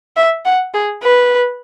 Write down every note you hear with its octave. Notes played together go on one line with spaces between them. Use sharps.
E5
F#5
G#4
B4